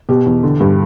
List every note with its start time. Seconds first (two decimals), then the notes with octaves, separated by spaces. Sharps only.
0.09 B2 G4
0.26 E2
0.43 D3
0.60 G2